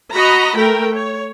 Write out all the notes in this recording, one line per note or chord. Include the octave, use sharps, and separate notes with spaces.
F#4 D#5 A#5 B5
A3 A#4 G5
C#5